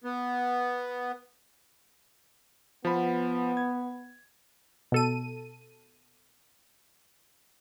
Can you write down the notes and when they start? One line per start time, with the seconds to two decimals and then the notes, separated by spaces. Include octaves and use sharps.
0.04 B3
2.85 F3 B3 B5
3.57 G#6
4.92 B2 A4 D#7